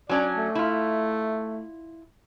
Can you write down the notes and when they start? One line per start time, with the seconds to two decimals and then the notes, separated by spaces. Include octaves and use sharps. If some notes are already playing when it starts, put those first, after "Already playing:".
0.09 F#3 C#4 D4 D5
0.37 A3
0.55 E4 F4